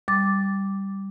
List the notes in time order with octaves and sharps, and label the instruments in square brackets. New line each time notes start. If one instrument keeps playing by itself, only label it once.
[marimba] G3 D6 A6